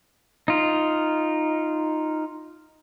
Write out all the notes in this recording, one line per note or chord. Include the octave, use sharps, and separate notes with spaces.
D#4 F4